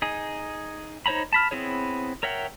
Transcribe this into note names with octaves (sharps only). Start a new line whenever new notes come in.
D#4 G#4
D#4 C5 C#5 A#5 B5
A5 B5 F6
B3 C4 E4 G#4 C#5
A#4 C#5 E5 F#5 G5